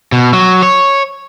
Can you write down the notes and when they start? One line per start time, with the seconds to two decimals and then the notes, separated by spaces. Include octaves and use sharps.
0.12 B2
0.33 F#3
0.63 C#5